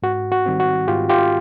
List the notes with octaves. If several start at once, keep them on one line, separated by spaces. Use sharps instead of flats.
G#2 F#4
F#4
D#3 G3 C4
F#4
G#2 F4 G4
F4 G4